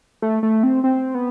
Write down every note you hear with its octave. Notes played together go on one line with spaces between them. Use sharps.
A3
A3
C4
C4
B3